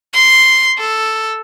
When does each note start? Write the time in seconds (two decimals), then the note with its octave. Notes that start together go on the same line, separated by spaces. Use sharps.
0.13 C6
0.78 A4